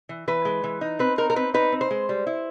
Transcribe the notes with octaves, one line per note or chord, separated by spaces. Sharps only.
E3
E3 B4
G#3
E3
D#4
C4 B4
D#4 A#4
A#4
C4 B4
D#4 B4
C4
C5
G#3
G3
E4